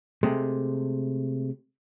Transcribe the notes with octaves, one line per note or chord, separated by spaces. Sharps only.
C3 G#3 A3